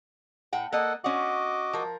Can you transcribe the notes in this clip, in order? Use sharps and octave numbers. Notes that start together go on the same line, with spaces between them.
A2 F#5 G5
A#3 A4 D#5 F#5
C#4 F#4 D#5 F#5 D6
F3 A#4